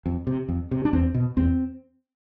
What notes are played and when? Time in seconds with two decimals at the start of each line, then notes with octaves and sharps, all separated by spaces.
0.06 F2
0.27 C3
0.49 F2
0.71 C3
0.85 D4
0.93 E2 C4
1.14 B2
1.37 E2 C4